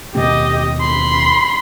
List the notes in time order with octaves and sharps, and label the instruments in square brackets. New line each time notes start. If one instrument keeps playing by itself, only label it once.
[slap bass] D#2 B2 C4 [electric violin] G4 D#5
[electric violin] B5 C6